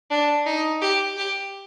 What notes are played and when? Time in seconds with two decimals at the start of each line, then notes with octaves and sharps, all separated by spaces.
0.11 D4
0.46 D#4
0.81 G4
1.17 G4